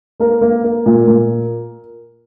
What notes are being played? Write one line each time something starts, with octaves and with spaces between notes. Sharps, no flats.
A#3 A#4
A#3
A#3
A#2
A#2